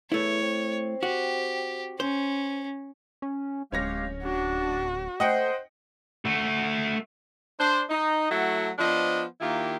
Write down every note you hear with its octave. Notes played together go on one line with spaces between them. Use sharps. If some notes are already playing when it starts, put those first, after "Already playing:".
E2 A3 E4 C#5
C4
F#4 G4
C#4 C5
C#4
D1 G#3 C#4 G4 C#5 F5 A#6
D4 F#4
A3 C5 D#5 F#5 G5
A3 F#4
D4 C5
D#4
F#3 A3 E4 F#4 A4
F3 B3 D4 C5 D#5
D#3 A#3 E4 F4 G4